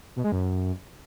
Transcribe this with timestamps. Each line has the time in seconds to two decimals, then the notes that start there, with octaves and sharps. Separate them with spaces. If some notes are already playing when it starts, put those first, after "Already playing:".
0.16 B2
0.24 G#3
0.32 F#2